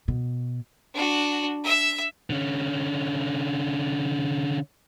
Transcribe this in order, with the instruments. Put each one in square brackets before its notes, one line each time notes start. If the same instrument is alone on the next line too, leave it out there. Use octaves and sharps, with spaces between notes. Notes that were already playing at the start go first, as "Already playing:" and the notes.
[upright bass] B2
[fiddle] D4 F#4
E5 E6
[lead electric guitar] D3 C#4